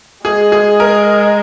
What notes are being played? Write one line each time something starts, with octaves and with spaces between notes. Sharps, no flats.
G#3 G#4
G#4
A#4